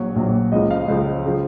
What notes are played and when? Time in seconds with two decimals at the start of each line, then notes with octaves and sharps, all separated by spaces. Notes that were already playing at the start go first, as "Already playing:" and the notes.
Already playing: A#1 A#2 F#3 C#5
0.16 A#1 A#2 F#3
0.52 C#2 C#3 F3 D#5
0.71 F5
0.88 C#2 C#3 F3 C5
1.26 C#3 F3